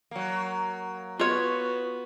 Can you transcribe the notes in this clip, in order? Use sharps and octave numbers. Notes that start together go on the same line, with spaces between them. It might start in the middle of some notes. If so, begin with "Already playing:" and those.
F#3 A#3
B3 F4 F#4 C#5